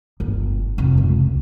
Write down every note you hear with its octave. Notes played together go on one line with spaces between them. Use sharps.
G1
F1
C#2